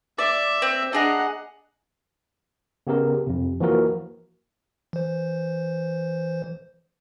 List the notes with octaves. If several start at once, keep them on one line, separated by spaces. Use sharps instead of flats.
D5 E5
C4
D4 G#4 D#5 F#5 A#5
C#3 B3 G4 A#4
F2 C3
E3 F3 A#3 F#4 A#4
E3 C5